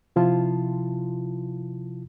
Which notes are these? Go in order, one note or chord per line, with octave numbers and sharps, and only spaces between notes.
C3 F3 E4 F4 A5